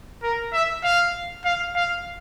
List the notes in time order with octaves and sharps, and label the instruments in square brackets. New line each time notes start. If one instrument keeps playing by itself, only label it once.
[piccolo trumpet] A#4
E5
F5
F5
F5